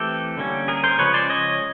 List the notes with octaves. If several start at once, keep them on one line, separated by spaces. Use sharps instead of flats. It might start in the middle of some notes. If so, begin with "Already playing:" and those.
Already playing: E3 A3 C4 G4 A4
D3 G3 A#3 C#4
G#4 A#4
A#4 C5
C#3 F3 G#3 C#4 B4 C#5
C5 D5
C#5 D#5